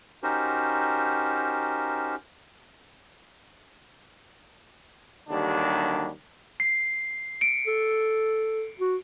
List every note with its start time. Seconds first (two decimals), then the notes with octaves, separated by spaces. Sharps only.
0.23 C#4 D#4 F#4 G4 A#4 C5
5.30 D#2 D3 F#3 G3 D4
6.60 C7
7.41 C#7 D7
7.67 A4
8.79 F#4